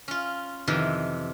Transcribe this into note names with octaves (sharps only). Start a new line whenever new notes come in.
C#4 F4
F2 C3 D#3 E3